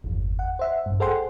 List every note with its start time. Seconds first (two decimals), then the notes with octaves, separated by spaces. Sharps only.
0.04 G1 E2
0.39 F#5
0.59 C5 E5 F#5
0.86 A1 G2
1.00 G#4 A4 C5 F#5 G5 C6